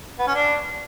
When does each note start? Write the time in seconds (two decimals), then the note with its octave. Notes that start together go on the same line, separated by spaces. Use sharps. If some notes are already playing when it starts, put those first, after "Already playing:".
0.19 B3
0.27 C#4
0.35 D4